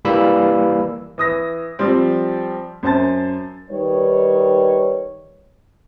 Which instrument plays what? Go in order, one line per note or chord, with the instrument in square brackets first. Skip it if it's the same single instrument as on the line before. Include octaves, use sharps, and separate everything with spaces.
[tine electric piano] E3 G3 A#3 B5 E6
[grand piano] E3 D#6 A#6
F3 G3 C4
F#2 C5 A5 A6
[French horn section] D#3 G3 D#4 B4 C#5